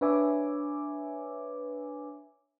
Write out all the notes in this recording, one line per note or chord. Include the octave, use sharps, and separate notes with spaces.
D4 B4 C#5 E5 G#5 D6